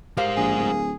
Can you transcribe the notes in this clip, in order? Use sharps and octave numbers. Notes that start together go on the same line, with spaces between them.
G#3 G4 A#4 C5 F5
A#1 G#4
D1